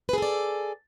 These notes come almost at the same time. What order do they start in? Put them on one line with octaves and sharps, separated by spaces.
B4 G#4 A4 D5